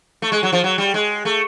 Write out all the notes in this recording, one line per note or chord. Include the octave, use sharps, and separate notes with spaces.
A3
G#3
F#3
F3
F#3
G3
G#3
A3